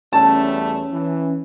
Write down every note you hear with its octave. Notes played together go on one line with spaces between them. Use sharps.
E2 G3 A3 C#4 A5
E3